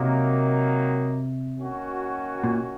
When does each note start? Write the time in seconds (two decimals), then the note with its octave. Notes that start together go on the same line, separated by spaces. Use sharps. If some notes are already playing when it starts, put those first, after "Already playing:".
Already playing: C3 D#3 F#3 A#3 D#4
1.59 D#3 A#3 C#4 F#4
2.44 A#2